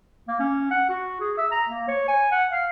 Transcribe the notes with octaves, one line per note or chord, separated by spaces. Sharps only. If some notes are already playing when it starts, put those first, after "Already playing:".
A#3
C#4
F#5
F#4
G#4
E5
A#5
A#3
C#5
G#5
F#5
F5